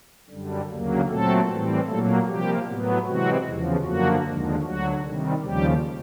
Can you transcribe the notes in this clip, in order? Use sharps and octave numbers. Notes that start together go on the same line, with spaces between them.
F#2 D3 G3
D2 C#3 F#3 A#3
A#2 F#3 A3 C4 A4
A2 E3 G3 C4
A#2 F#3 A3 A#3 A4
C3 F3 G3 A#3 G4
A2 F#3 B3
C3 E3 F#3 G#3 C4 F#4
E2 C#3 F3
F#2 D3 F3 F#3 A#3 F#4
D#2 D3 F3 G#3
D2 D3 F#3 F#4
C3 D#3 G3
D#2 C#3 F3 G3 G4